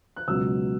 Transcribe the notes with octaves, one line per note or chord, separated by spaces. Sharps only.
F#6
C#2 B2 F#3 B3 E6